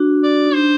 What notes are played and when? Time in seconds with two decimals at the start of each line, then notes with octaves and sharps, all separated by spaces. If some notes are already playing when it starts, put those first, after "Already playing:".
Already playing: D4 F#4
0.23 D5
0.45 D#4
0.54 D4 C5